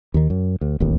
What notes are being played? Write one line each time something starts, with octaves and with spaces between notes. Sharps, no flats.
D#2 D#3
F#2
D2
D1 A1 D#2